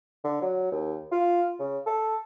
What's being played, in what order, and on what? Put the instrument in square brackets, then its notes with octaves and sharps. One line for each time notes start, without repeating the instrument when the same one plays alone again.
[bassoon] D3
F#3
D#2
F4
C#3
A4